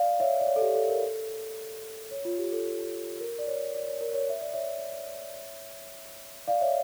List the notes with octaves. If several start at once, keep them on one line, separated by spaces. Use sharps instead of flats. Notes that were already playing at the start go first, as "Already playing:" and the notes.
Already playing: D5 F5
C#5 E5
D5
C#5
A4
G4
A4
A#4
A4
C#5
F4
G4
A4
A#4
D5
C#5
D5
C#5
A#4
C#5
E5
D5
C#5 E5
D5 F5
C#5 E5